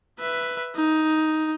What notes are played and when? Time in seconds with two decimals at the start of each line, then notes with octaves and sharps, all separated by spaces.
0.20 B4 E5
0.76 D#4